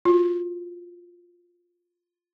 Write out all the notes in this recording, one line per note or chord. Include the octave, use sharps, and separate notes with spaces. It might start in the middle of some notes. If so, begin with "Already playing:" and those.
F4 F#4